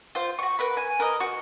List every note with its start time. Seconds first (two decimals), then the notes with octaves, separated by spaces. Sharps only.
0.15 F4 C5
0.39 F#4 C#6
0.59 A#4 B4 B5
0.77 G#5
1.00 A#4 B4 D#5
1.20 F#4